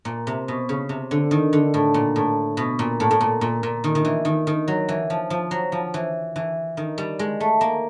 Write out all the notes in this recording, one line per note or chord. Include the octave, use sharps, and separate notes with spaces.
A#2
C3
B2
C#3
C3
D3
D#3
D3
A2
A#2
A2
B2
A#2
A2
A2
A#2
A#2
A#2
D#3
D#3
E3
D#3
D#3
F#3
E3
F3
F3
F#3
F3
E3
E3
D#3
G3
G#3
A3
A#3